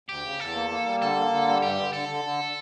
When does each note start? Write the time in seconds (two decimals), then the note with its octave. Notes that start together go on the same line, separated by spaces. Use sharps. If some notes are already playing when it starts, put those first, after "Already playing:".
0.09 D2 G4
0.24 C#3
0.40 E2 A4
0.55 A#3
0.71 A#3
0.86 G3
1.01 D3 A4
1.17 A#3
1.32 D3
1.48 G3
1.62 G2 G4
1.79 D3
1.93 D3 A4
2.09 D3
2.25 D3